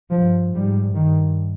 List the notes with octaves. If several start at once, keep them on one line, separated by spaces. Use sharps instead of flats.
G2 F3
G#2 G3
G2 D#3